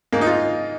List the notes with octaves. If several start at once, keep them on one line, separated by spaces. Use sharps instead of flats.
G#2 A#3
D#4
F4